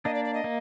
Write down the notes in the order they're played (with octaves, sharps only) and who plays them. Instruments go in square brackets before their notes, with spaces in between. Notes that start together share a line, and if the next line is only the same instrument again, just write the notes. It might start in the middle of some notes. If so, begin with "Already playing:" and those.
[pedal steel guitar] A#3 D4 [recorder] D#5
[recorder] D5
D5
D#5
[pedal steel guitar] A#3